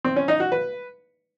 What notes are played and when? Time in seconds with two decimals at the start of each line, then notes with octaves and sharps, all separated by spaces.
0.05 C4
0.16 C#4
0.28 D#4
0.40 F#4
0.52 B4